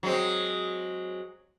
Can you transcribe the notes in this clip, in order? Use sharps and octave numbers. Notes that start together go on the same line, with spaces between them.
F#3 G#3 C4